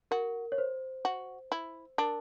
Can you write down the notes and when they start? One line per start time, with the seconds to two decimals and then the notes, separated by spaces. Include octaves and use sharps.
0.11 F#4 A#4
0.52 C#5
0.58 C5
1.05 F#4
1.52 E4
1.98 D4 A#4